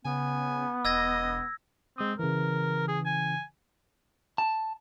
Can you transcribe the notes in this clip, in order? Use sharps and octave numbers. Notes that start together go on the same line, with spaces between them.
C#3 B3 G#5
E1 D#5 E6 G#6 A#6
G#3 C4 D#6
C#3 E3 A#4
G#4
G#5
A5